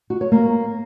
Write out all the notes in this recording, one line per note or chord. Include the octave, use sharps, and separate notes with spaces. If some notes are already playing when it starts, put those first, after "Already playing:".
F#4
C#5
A#3